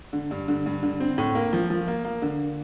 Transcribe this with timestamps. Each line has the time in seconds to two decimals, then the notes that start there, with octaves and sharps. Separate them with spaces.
0.13 D3
0.31 G2
0.48 D3
0.66 G2
0.83 D3
1.00 C4
1.18 A2
1.35 A#3
1.53 F3
1.70 F3
1.88 A#3
2.05 A#3
2.22 D3